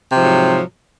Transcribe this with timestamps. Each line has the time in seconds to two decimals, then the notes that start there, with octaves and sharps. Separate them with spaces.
0.11 C3
0.15 F3
0.19 G#2
0.23 F#3